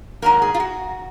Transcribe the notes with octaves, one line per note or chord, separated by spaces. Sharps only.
G#2 D#3 F#3 A#3 A#4
G#4
F4
F#4